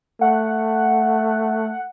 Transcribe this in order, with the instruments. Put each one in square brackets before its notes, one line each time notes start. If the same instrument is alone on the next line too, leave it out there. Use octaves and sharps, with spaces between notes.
[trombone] A3 [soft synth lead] F#5